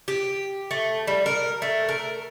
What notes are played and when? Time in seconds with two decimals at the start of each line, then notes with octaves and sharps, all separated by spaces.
0.08 G4
0.71 A3
1.07 G3
1.26 A#4
1.62 A3
1.89 A#4